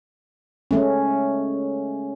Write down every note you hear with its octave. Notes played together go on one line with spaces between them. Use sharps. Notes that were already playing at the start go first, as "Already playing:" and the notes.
G#3 A3 C#4